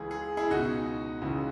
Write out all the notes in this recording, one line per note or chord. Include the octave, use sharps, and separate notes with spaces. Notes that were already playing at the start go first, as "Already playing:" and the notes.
Already playing: C#2 C#3 E3 G#4
G#4
E4 G#4
C#2 B2 D#4 F#4
C#2 C#3 E3